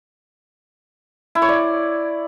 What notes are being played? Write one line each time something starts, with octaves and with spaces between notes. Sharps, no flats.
E4
C#5
D5